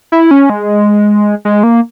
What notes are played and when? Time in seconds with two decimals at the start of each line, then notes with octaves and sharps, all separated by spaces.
0.12 E4
0.31 C#4
0.50 G#3
1.45 G#3
1.63 A#3